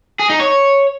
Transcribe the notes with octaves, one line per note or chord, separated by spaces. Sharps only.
G#4
D#4
C#5